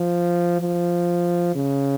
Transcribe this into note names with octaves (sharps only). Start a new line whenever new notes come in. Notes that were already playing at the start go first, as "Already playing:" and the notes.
Already playing: F3
F3
C#3